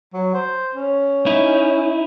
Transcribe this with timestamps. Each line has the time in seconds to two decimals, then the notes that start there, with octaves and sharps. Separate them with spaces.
0.13 F#3
0.34 C5
0.75 C#4
1.26 D#4 E4